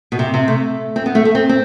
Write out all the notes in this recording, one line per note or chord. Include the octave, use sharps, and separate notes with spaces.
B2
C3
C3
A3
C4
B3
A3
A3
C4
C4